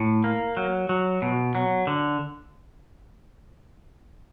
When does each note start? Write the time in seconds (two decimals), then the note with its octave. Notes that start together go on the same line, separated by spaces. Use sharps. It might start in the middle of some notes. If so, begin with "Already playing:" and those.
Already playing: A2
0.24 A#3
0.57 F#3
0.89 F#3
1.22 B2
1.55 F#3
1.87 D3